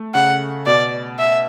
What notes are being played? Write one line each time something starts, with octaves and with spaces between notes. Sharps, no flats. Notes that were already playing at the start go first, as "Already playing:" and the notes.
Already playing: A3
C#3 F#5
B2 D5
E5